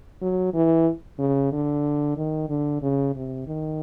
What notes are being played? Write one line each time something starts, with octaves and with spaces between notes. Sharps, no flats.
F#3
E3
C#3
D3
D#3
D3
C#3
C3
D#3